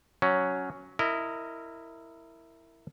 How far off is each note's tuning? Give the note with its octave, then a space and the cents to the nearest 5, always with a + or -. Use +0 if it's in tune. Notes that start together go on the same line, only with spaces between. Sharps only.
F#3 +0 C#4 +5
E4 +0 A#4 -20 D#5 +0